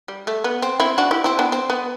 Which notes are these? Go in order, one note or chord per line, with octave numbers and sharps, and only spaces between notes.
G3
A3
B3
C4
C4 E4
D4 F#4
E4 G4
C4 E4
B3 D4
C4
B3